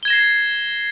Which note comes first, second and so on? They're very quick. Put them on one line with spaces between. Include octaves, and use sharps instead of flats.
G7 G#6 E7 A#6 C7